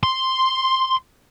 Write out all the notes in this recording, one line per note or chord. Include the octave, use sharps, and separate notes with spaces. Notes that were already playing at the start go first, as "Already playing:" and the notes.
C6